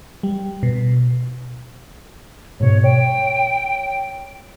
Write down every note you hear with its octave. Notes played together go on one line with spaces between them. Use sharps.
G3
B2
G#2 B2 C#5
C#5 G5